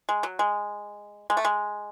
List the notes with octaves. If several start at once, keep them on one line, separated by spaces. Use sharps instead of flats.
G#3
F#3
G#3
G#3
A3
G#3